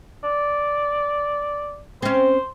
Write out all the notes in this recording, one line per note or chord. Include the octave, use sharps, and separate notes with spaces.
D5
C4 C#4 C5